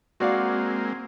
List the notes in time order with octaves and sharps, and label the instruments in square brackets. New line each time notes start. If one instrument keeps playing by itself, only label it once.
[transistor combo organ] G#3 A#3 C4 [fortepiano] F#4 D5 F5